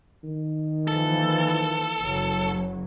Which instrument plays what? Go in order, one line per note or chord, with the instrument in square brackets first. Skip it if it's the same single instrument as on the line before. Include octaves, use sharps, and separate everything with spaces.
[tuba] D#3
[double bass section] E3 F3 A#3 [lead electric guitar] A4
[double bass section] F#1 F#3